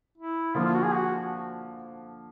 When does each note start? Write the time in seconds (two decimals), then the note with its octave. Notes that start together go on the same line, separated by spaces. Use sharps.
0.18 E4
0.55 D3 F3 A#3 F4
0.65 F4
0.74 F#4
0.83 G#4
0.93 F#4